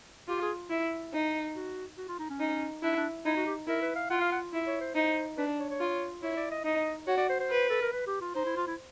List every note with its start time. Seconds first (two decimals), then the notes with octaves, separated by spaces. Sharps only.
0.28 F4 G4
0.42 G#4
0.70 E4
1.13 D#4
1.55 F#4
1.97 F#4
2.08 F4
2.19 D#4
2.30 C#4
2.40 D#4
2.83 D4 E4
2.97 D4
3.25 D#4 E4
3.36 F#4
3.46 G4
3.67 E4 A#4
3.82 B4
3.95 F5
4.10 F4 F#5
4.21 F5
4.32 F#5
4.53 E4
4.67 C#5
4.81 C5
4.95 D#4 C5
5.37 D4 B4
5.59 C#5
5.69 C#5
5.80 F4
6.22 E4 C#5
6.37 D5
6.51 D#5
6.65 D#4 D#5
7.07 F#4 C#5
7.17 D5
7.29 C5
7.40 C5
7.50 B4
7.69 A4
7.81 A#4
7.92 B4
8.07 G4
8.21 F4
8.35 D#4 C5
8.45 E4
8.56 F4
8.67 E4